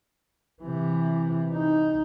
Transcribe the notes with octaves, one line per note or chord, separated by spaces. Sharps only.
C3 E3
D#4